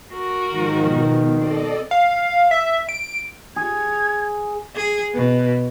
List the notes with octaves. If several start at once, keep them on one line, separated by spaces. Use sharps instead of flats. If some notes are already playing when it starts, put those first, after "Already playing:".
F#4 A#4
G#2 D#3 F3
B2
C4 A4 D5 D#5
F5
E5
D7
G#4 G#6
G#4
B2